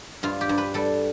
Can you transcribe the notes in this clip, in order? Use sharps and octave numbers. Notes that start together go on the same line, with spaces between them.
G2 F4
G4
G2
B4
G3 A4